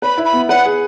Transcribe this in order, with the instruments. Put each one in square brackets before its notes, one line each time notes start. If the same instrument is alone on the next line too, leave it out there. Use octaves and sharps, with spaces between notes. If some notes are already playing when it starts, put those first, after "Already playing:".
[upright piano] B4 [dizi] B5
[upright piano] E4
[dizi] B5
[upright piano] B3
[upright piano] B4 [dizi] F#5
[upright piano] G#4